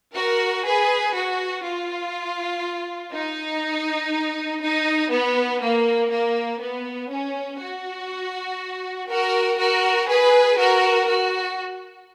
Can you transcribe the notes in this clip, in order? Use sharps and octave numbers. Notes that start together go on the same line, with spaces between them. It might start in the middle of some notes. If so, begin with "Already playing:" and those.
F#4 A#4
G#4 B4
F#4
F4
D#4
D#4
B3
A#3
A#3
B3
C#4
F#4
F#4 A#4
F#4 A#4
G#4 B4
F#4 A#4
F#4